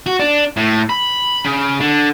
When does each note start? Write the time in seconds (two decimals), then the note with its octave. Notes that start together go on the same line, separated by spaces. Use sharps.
0.06 F#4
0.20 D4
0.57 A2
0.90 B5
1.45 C#3
1.80 D3